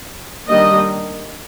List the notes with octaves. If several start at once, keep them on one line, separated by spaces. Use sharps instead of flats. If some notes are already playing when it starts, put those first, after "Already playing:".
D#3 G3 A#3 D4 D#5